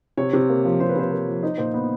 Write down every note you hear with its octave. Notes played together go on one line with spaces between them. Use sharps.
C3 C#5
C3
A#3
F3
C3 C5
B4
C3 C5
A#3
F3
D#4 C5
A#2 C5
B3